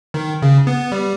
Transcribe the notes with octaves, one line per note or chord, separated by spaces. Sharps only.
D#3
C#3
B3
G3